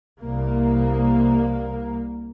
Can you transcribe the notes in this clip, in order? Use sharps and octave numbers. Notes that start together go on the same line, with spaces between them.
C2 A#3